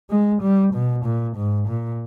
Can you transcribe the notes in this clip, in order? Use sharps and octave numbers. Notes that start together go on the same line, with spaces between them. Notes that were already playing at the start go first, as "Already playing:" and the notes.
G#3
G3
B2
A#2
G#2
A#2